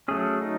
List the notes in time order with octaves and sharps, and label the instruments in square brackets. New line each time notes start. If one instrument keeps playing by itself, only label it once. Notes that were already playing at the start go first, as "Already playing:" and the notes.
[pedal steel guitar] F#3 A3 C#4 G#4
D#4